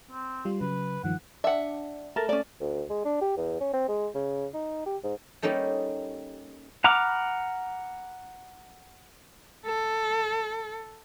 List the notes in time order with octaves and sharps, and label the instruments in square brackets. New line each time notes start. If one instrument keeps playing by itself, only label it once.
[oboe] C4
[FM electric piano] G3 F4 C6
[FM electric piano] C#3 F#3 [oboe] B4
[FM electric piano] G2 D#3 F3 [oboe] F#5
[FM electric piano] D4 [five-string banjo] E5 F#5
[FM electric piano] A3 A5 [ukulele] A#4
[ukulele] C#4 D5
[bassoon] D2
G#3
D4
G4
E2
C#4
C4
G#3
C#3
D#4
G4
G#2
[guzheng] G3 A#3 C#4 D#4 A4
[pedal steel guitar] F#5 A#5 B5 D6 F6
[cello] A4